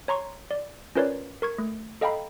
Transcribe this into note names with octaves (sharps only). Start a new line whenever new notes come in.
C#5 A#5 C6 C#6
D5
C#4 F4 A#4 B4 C#5 D5
A#4 C#6 G#6
A3
A4 D#5 F5 G5 A#5 B5